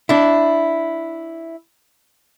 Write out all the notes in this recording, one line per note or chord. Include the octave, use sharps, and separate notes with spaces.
D4 E4